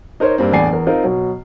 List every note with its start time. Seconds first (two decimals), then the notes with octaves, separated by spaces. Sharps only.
0.20 D#4 A#4 C5 C#5
0.38 G2 A#3 C4
0.52 E2 A2 D4 D5 G#5 C7
0.71 E2 A#4
0.87 C4 D#4 F4 A#4
1.04 B2 F#3